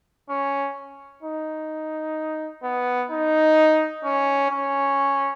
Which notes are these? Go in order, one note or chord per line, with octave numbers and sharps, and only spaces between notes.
C#4
D#4
B3
D#4
C#4
C#4